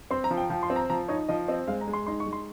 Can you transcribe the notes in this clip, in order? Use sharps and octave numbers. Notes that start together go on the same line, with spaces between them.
C4 C6
A#5
F3
G5
F3 G5
C6
C4
A#5
F3 A#5
D#4 C#5
F3 D#5
C4 D#5
G#3 F5
A#5
G#3
C6
D#4 C6
C#6
G#3
C6